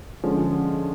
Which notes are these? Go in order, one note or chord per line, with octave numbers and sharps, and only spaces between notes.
D3 F3 G#3 C#4